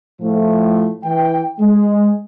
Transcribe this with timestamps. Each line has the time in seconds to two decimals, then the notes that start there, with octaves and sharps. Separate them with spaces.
0.21 A2 F3 A3
1.04 E3 G5
1.60 G#3